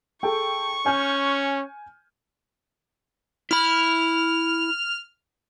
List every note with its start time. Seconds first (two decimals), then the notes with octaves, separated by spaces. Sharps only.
0.23 G#4 A4 G5 C#6
0.86 C#4 G#5 F6 G6
3.51 E4 B5 F6